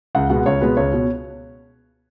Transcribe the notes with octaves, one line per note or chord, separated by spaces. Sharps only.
C#2 F#5
B2 G#3 B3 F#5
C#2 C#5
B2 G#3 B3 B4
C#2 C#5
B2